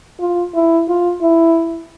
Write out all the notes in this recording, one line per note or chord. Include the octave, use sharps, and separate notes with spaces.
F4
E4
F4
E4